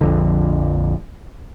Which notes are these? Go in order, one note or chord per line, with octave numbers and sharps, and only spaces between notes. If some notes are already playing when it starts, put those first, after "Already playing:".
A#1 F2 D3